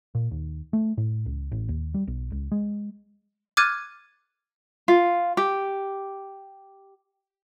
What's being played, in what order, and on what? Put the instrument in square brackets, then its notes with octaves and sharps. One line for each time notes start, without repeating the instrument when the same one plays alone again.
[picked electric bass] A#2
D#2
A3
A2
C#2
A1
D#2
G3
B1
C#2
G#3
[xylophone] D6 F6 F#6 G#6 A6 D#7
[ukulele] F4
G4